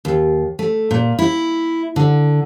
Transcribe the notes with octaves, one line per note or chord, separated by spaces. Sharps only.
D#2
A3
A#2
E4
D3